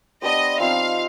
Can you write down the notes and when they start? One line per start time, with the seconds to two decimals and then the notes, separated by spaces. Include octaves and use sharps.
0.22 B3 D4 G4 C5 D#5
0.60 F3 C4 D#4 F5